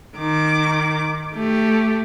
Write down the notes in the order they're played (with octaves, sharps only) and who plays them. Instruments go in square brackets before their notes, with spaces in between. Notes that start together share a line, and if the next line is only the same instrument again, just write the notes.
[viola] D#3 D6
A3 G4